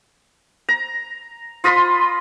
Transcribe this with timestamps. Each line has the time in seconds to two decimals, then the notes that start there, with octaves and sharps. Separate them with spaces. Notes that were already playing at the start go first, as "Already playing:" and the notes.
0.69 A#5
1.64 F4 D#5 B5 C6